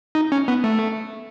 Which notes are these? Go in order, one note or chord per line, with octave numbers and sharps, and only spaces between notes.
D#4
C#4
B3
A3